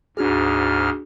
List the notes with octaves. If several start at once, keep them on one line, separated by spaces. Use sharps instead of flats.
D2 G#2 D4 F#4 G#4 F6